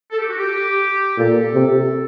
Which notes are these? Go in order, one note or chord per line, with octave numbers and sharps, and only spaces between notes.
A4
G4
F#4
G4
A#2 A4
C3